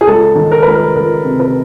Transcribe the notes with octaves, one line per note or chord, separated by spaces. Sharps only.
G#4
C#2 A4
D#3
A#4
C#2 B4
A#4
C#2 A#4
C3
B4